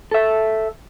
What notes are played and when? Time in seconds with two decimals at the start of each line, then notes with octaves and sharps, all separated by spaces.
0.11 A4 E5